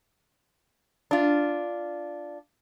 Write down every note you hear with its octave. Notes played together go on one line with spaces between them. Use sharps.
D4 F4